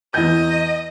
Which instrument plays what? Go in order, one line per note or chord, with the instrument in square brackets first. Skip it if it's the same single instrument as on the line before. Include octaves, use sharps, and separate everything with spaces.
[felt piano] E2 G6 [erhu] D#5